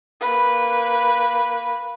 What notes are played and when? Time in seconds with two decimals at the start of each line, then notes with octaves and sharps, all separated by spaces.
0.21 A#3 B4